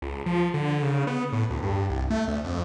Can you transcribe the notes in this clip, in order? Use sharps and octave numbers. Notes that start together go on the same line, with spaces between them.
C#2
F3
D3
C#3
B3
A2
D2
G2
C2
A3
D2
F2